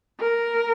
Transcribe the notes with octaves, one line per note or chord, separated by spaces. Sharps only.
A#4